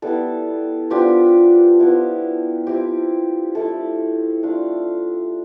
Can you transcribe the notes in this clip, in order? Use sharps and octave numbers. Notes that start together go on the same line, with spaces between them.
G3 B3 E4 A4
F3 B3 D4 F4 G4
F3 B3 E4
F3 C4 E4 G4
F3 A3 E4 A4
A3 D4 F4